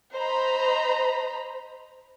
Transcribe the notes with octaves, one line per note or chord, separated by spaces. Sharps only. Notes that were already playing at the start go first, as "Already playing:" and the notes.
C5 D#5 A#5 B5